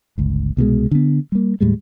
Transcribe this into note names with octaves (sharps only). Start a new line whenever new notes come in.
G1 C#2
C2 B2 D3 G#3
D3 B3
G3 A#3
D#2 A2 G3 G#3